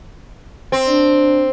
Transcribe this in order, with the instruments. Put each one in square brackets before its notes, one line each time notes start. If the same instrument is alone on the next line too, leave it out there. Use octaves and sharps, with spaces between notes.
[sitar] C4
[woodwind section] D4